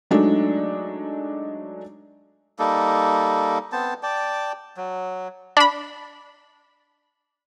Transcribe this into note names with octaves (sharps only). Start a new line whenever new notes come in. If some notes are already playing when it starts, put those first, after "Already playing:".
F#3 G#3 A3 D4 D#4
G3 A#3 D#4 A4
B3 C4 C5 A5
D5 G5 A5
F#3
D4 B5